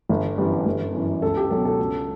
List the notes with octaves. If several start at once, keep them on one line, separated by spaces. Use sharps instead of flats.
G1
F#2 E3 G3
G1
F#2 E3
C#2 A4
G4
B2 F#3 A4
A4
C#2